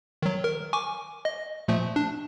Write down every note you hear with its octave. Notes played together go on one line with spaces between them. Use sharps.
D#3 F#3
A#4
G#5 C#6 D6
D#5
A#2 F3 A3
D4